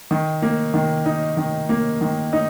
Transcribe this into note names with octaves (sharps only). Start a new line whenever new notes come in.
D#3
A#3
D#3
D#4
D#3
A#3
D#3
D#4